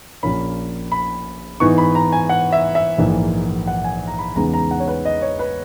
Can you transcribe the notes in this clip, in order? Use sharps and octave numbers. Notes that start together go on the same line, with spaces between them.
A#1 A#2 A#3 C#4 B5
B5
G#2 E3 B3 D#4 C#6
B5
A#5
G#5
F#5
E5
E5
A#1 G#2 E3 A#3
F#5
G#5
A#5
B5
E2 C#3 G#3 B3 D#4 A#5
A#5
F#5
C#5
B4
D#5
C#5
B4